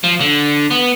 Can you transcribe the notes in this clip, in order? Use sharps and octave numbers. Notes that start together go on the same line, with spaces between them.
F3
D3
B3